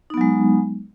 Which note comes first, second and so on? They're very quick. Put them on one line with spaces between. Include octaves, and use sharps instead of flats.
D#4 B3 F#3 G#3